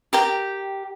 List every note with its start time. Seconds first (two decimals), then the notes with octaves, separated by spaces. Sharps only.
0.13 G4 A#4 G5